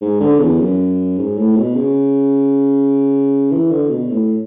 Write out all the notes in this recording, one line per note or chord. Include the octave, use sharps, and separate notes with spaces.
G#2
D3
E2
F#2
G#2
A2
B2
C#3
E3
D3
B2
A2